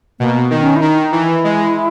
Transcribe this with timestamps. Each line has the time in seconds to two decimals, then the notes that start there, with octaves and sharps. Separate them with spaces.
0.20 B2 A#3
0.51 D#3
0.61 C#4
0.76 E4
0.81 D#3 D#4
1.02 D#4
1.12 E3
1.23 E4
1.44 G#3